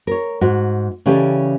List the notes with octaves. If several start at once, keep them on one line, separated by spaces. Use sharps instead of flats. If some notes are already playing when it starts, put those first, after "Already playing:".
A#4 C#5
G#2 F#4
C#3 E3 C#4 G4 A4 D5